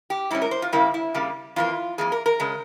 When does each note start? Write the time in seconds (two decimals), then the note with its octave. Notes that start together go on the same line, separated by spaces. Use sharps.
0.10 G4
0.31 G#2 G3 C#4 E4
0.42 A#4
0.51 C5
0.62 F4
0.73 C#3 G3 A#3 E4
0.94 E4
1.14 C#3 G3 A#3
1.56 F2 E3 A#3 F4
1.98 F2 E3 A#3 G#4
2.12 A#4
2.26 A#4
2.40 C#3 G#3